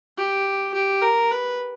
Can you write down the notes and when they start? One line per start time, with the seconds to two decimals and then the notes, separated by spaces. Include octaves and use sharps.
0.17 G4
0.74 G4
1.02 A#4
1.31 B4